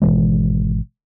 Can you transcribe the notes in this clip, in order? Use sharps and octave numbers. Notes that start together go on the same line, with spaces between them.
G#1 B2 E3 G#3